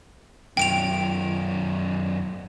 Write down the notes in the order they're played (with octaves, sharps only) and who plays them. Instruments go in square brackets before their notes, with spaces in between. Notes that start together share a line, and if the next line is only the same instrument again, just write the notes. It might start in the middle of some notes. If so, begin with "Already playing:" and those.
[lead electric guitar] F#2 D#3 [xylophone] G5 D7 F7